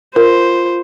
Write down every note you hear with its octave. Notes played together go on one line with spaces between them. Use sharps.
F4 A#4 C5